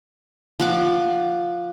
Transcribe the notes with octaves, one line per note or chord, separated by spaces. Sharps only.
F3 F#5 D6